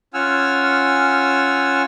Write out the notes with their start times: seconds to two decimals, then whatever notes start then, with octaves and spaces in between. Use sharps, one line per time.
0.14 C#4 F4 F#5 G#5 E6 F6